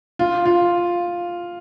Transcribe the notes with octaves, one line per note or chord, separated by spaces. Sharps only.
F4
F4